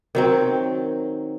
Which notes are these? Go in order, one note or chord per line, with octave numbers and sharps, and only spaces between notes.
D#3 F#3 C4